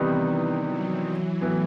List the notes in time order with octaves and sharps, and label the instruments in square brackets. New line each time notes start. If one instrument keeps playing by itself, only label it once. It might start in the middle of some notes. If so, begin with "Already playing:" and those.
Already playing: [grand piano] C3 D#3 G3 B3 D#4 [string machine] E3
[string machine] F#3
[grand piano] A2 E3 B3